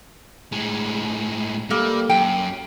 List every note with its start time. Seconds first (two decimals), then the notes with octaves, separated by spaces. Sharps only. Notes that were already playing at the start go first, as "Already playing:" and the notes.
0.52 A2 G#3
1.70 G3 A#3 A4
2.09 F#2 G5